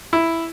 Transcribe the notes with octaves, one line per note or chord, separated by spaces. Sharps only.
E4